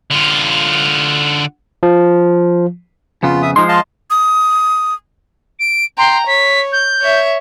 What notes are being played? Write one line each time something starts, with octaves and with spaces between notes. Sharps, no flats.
D3 F4
F3
F2 C#3 B3 F4
E5 D#6
F3 G#3 D#4 C6
D#5 F5 A5
D#6
D7
G5 A#5 C6
C#5 B6
G6
C#5 E5